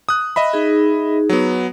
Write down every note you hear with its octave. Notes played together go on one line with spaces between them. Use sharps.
D#6 F#6
D#5 E5 B5
D#4 G#4
F#3 B3